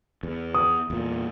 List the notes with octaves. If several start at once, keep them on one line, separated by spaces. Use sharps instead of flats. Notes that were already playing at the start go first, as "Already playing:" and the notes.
E2
D#6
E2 A#2